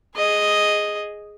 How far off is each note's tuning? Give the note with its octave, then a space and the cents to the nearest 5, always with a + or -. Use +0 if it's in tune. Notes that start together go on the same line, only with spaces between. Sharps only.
G#4 +0 D#5 +0